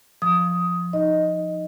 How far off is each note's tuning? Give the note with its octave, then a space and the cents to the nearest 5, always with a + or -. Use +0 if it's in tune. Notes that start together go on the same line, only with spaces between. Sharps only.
F3 +10 D#6 +10
D#4 +0 D#5 +0